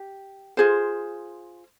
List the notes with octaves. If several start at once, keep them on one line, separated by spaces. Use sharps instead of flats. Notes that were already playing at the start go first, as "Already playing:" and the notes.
Already playing: G4
F4 G#4 C5